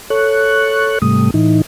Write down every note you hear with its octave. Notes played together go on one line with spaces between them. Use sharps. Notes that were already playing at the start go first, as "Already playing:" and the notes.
A4 C#5 C#6 F#6
G#2 C3 G3 A3 D#6
A2 E3 D#4